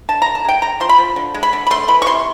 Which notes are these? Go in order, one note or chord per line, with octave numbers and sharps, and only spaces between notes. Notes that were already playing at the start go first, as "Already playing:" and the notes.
D3 A5
D3 A#5
A5
G#3 G5
D3 A#5
F3 C6
B5
F3
D3
G#3
B5
D3
B5
A3 C6
E3 B5
C#6
C3 C6